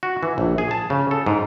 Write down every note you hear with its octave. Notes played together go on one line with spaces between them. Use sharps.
F#4
E3
A#1
G#4
A5
C#3
A4
G#2